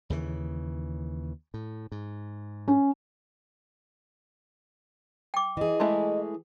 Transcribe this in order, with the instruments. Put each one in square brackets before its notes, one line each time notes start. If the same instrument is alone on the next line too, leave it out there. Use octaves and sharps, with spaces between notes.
[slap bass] D#2 C#3 E3
A2
G#2
[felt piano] C#4
[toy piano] G5 D6
[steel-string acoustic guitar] E3 G#4 [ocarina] D#5
[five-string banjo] G#3 A3 E4